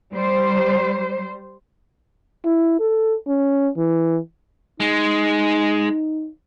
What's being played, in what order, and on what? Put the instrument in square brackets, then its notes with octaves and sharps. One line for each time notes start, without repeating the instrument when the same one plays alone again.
[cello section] G3 C5
[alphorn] E4
A4
C#4
E3
[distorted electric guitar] G#3 [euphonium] D#4